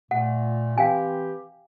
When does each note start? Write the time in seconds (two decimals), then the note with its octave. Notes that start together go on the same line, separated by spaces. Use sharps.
0.11 A#2 A3 F#5
0.78 E3 C4 G4 F5 G5 G#5